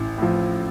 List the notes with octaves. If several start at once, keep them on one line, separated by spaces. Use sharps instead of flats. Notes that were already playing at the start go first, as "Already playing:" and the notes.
Already playing: A1 E4
A2 F3